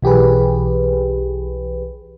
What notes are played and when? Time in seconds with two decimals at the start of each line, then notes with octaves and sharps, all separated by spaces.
0.02 B1 E3 G4 G#4 B4